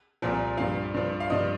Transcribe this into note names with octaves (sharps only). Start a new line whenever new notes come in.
C2 A#2 F3
G2 F3 F5
G2 F3
F5
G2 F3 D#5